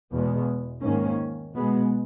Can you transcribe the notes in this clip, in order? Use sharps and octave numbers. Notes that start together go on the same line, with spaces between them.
E2 B2 G#3 B3
G#2 D#3 A#3 C#4
B2 G#3 B3